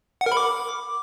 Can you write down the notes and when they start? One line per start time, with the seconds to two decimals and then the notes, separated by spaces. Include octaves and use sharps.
0.21 F#5
0.26 A#4
0.32 B5
0.37 D6